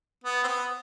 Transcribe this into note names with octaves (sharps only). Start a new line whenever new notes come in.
B3
C4
B3